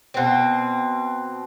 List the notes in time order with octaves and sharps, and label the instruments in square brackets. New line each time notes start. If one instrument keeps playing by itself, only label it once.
[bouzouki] B2 C4